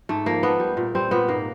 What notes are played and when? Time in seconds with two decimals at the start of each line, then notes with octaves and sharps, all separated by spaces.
0.09 G#2 A3
0.26 F3 A#3
0.43 A3 B3
0.60 G3
0.77 A#2
0.95 G3 C4
1.11 A#2 B3
1.28 G#2 A#3